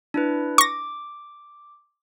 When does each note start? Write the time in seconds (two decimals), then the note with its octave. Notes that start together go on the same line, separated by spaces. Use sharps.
0.14 D4 E4 B4
0.58 C#6 D6 A#6